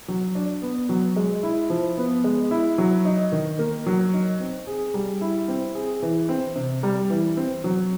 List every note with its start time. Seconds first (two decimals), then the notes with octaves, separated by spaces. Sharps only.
0.08 F#3
0.35 D4
0.62 B3
0.89 F#3
1.16 G#3
1.43 E4
1.70 F3
1.97 B3
2.24 G#3
2.51 E4
2.78 F#3
3.05 D#4
3.32 D#3
3.59 A#3
3.86 F#3
4.14 D#4
4.40 C4
4.67 G#4
4.94 G3
5.21 E4
5.48 C4
5.75 G#4
6.02 E3
6.29 C4
6.56 C3
6.83 G3
7.10 E3
7.37 C4
7.64 F#3